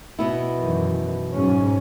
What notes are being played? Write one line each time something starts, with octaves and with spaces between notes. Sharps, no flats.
B2 B3 E4
F#2 D#3 E3
G#2 F#3 C#4